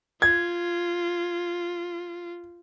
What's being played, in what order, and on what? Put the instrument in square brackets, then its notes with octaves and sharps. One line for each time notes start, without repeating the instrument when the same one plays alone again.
[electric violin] F4 [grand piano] G#6